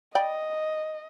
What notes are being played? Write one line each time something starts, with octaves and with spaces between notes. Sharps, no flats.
D5 D#5 G5 B5